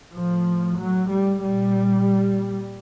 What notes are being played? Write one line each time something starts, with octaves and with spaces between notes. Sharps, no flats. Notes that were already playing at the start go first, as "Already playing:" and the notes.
A2 F3
F#3
G3
A#2 G3